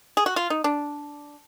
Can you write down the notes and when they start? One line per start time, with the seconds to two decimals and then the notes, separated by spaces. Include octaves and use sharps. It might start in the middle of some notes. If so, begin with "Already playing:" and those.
0.17 G#4
0.26 F#4
0.36 F4
0.50 D#4
0.64 D4